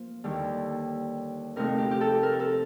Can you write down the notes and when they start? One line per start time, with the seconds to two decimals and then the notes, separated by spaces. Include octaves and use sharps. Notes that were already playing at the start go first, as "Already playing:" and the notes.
Already playing: F3 A#3 F4
0.24 D#2 D3 G3
1.56 F2 C3 F3 A3 D#4 A#4
1.78 G4
1.91 G4
2.01 A4
2.23 A#4
2.40 A4